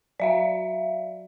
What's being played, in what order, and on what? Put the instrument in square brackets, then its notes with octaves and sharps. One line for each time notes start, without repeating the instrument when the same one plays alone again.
[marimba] F#3 F#4 [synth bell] D5 E5 F5